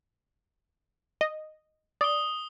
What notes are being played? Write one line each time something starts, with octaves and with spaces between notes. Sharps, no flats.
D#5
D5 D#6 G7